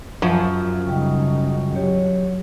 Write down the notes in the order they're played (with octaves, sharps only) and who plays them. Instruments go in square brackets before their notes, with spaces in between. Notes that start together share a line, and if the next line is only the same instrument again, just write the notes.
[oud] F#2 [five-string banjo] F3
[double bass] C#3 D#4 [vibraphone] G3 G5 C#6
[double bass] F#3 [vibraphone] G4 C#5